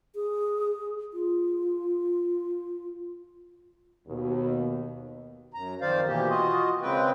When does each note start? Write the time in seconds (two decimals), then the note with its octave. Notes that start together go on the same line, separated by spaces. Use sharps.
0.15 G#4
1.13 F4
4.07 D#2 B2
5.54 F#2 A#5
5.81 F2 D#3 C5 D5 F5
6.07 B2 E3 A#3 G4
6.29 F4 F#4 D#5
6.82 C#3 G#3 C4 B4 G5